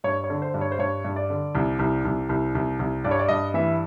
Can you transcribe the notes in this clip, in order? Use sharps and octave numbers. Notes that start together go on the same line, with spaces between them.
G2 C#5
C#5
D3
C5
G2
C#5
C5
G2 C#5
G2
D5
D3
C2
C2
C2
C2
C2
C2
G2 D5
C#5
D5
G2 D#5
E3 E5